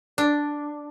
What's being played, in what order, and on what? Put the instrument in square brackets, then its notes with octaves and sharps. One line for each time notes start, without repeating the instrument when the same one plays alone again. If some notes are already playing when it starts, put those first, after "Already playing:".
[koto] D4